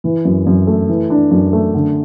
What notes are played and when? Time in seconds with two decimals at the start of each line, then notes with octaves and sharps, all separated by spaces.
0.04 E3
0.25 F#2
0.46 F#2
0.67 A3
0.89 E3
1.10 D4
1.31 F#2
1.53 A3
1.74 D3